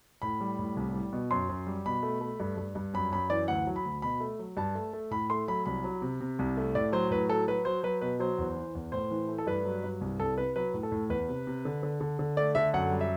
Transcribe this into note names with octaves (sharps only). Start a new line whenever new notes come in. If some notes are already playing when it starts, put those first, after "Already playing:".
A2 B5
G3
A2
C2
G3
B2
F#2 C6
F#2
G3
B2 B5
A3
A3
G2
G2
G2
F#2 B5
F#2 B5
E3 D5
D2 F#5
F#3
B5
D2
B2 B5
A3
F#3
G2 A5
A3
A3
A2 B5
A3 C6
F#3 B5
C2 B5
F#3
C3
C3
C2
A3
A2 D5
F#3 C5
A2 B4
F#3 A4
F#3 B4
F#3 C5
F#3 B4
B2 B4
F#3 C5
E2
E3
E2
A2 C5
E3
A3
A4
G2 B4
F#3
G2
C2
C2 A4
C3 B4
F#3 B4
A2
A4
A2
E2 B4
C3
C3
D3
D3
D3
D3
A3 D5
D3 E5
F#2 F#5
G3
E5